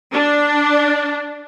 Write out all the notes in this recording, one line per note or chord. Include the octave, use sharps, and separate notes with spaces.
D4